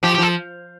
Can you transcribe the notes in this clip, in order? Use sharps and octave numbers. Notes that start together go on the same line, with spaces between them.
F3 G4
G4
F3 A4